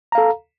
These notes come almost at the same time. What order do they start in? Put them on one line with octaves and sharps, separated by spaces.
A#5 F5 A4